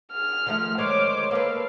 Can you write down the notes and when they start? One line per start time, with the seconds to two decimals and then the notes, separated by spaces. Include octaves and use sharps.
0.13 G#4 F6
0.46 D#3 F3 A3
0.78 D2 D#3 G#3 C5 C#5 D6 D7
1.31 A#3 A4 B4 F5